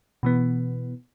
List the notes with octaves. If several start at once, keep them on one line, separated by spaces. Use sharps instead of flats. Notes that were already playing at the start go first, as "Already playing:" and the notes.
B2 E3 B3